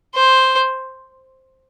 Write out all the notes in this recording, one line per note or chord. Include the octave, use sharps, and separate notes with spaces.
C5